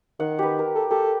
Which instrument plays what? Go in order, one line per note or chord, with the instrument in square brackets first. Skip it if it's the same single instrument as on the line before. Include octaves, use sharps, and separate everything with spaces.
[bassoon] D#3 [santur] F#5
[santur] G4 B4
A#4
[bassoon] A4
[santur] G4 [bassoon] A4